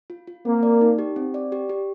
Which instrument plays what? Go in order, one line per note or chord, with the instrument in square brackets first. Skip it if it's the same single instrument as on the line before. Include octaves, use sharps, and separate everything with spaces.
[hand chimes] F4
F4
[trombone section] A#3 [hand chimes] C4
[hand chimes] D5
D#4
G4
C4
D5
G4
G4